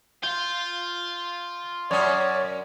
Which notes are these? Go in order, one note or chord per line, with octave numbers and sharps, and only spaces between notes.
F4 G6
F#2 C#4 C#5 D5 F6